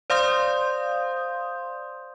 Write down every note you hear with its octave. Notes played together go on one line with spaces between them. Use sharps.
C5 D5 F5 C6 D#6 G6